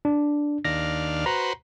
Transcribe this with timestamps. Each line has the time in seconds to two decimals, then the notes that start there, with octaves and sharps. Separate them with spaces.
0.05 D4
0.65 D#2 D4 F5 A#6
1.26 F#4 B4 C5 A#5